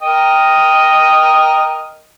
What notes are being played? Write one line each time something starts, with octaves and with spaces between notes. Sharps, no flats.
A#4 D#5 G5